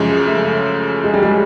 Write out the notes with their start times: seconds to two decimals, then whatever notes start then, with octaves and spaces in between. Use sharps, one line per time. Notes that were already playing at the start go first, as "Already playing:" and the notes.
Already playing: F#2 C#3 F3 G#3
0.27 A3
1.04 G#3
1.14 G3
1.23 G#3